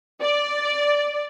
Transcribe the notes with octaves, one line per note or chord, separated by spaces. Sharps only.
D5